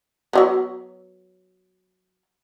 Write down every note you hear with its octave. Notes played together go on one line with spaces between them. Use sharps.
F#3 G3 B3